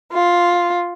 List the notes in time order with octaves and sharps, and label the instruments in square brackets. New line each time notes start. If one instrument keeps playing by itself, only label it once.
[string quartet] F4